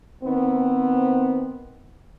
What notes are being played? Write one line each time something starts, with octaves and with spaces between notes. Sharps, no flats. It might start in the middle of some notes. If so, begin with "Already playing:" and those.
D#3 B3 C4